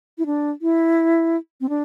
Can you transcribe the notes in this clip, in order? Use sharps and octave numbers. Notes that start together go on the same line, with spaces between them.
E4
D4
E4
C4
D4